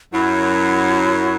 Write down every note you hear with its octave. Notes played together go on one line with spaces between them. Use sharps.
F#2 F#3 E4